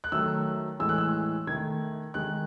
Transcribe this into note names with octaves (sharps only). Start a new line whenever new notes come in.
F#6
D#3 F#3 A3 E6
A2 E3 G#3 E6
F#6
E6
D#3 A3 G#6
D#3 G#3 F#6